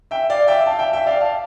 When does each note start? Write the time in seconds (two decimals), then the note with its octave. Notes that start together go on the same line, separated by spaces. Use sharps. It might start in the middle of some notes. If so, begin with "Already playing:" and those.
0.11 E5 G5
0.30 D5 F5
0.48 E5 G5
0.66 F5 A5
0.79 E5 G5
0.93 E5 G5
1.06 D5 F5
1.21 F5 A5